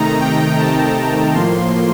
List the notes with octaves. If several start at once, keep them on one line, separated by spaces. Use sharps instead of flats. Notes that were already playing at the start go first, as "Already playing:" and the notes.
Already playing: C3 D#3 A3 D#4 A#5
G5
A5
A2 F3 A#3 C6